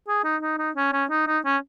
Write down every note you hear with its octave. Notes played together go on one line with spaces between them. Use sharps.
G#4
D#4
D#4
D#4
C#4
C#4
D#4
D#4
C#4